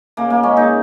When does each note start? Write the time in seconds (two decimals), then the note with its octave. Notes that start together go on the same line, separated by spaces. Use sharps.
0.17 C#3 A#3
0.30 A#3
0.43 G#3 C#4
0.57 D#4